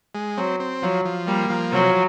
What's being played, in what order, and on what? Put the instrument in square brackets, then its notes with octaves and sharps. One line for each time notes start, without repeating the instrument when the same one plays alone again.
[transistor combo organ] G#3
[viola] F#3 [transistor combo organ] C4
[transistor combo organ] C4
[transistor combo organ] F3 [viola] F#3
[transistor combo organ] F3
[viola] G3 [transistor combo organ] A#3
[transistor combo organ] F3
[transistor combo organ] C3 [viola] F#3